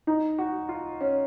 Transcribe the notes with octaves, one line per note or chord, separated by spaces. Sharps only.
D#4
F#4
F4
C#4